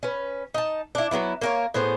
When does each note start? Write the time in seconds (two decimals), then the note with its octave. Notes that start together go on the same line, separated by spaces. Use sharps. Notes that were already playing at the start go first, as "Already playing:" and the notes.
0.03 C#4 B4
0.54 D#4 A5
0.95 D4 E4
1.11 F#3 G3 B3 E4
1.41 A#3 A#4 C#5
1.74 A2 B3 G#4 C5